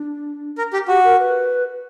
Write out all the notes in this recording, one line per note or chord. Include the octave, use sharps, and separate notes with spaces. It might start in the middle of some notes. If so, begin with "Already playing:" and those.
Already playing: D4
A#4
G4
F#4 G4
A#4
B4